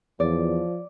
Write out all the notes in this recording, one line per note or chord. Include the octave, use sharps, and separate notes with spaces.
E2 F3 D5